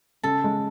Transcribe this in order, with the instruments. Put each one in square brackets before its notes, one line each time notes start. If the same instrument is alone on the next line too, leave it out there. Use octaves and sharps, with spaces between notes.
[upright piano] C#3 [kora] A4
[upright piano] G#3